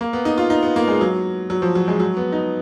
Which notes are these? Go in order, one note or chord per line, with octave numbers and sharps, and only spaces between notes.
A#3
B3
D#4
F4
D#4
B3
A#3
G#3
F#3
F#3
F3
F#3
G#3
F#3
B3
D#4